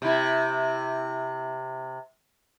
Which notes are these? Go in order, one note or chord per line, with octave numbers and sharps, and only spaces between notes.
C3 E4